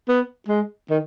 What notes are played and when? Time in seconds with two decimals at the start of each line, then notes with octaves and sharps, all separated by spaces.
0.08 B3
0.48 G#3
0.90 D#3